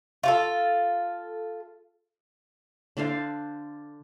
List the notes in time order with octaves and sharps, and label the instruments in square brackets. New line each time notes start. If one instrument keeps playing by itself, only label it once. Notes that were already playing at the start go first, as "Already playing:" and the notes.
[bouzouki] F4 F#4 A4
[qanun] D3 D4 C5 F5